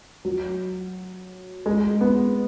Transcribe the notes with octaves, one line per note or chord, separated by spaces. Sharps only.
F#3
G#3
B3